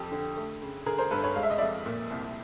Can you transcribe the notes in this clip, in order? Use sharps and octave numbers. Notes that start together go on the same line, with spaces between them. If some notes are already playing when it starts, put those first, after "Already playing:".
Already playing: F2 G4 A4
D3
A3
C#3
D3 G#4 A#4
A#4 C5
G2 A4 B4
B4 C#5
G#3 F5
E5
D#5
F2 D5 E5
A#2
C2